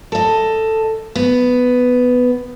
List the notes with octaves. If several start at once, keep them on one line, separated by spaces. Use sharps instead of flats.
A4 D#5
B3